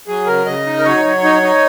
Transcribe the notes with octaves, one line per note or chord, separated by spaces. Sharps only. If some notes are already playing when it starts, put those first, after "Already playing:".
F#3 G#4
C#3 A#4
C#3 D#5
D#4
A#4
F#3 C#5
F#3
D#4
D#4